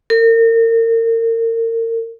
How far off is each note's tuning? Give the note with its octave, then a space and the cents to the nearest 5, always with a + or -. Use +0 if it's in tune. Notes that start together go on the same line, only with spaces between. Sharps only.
A#4 -35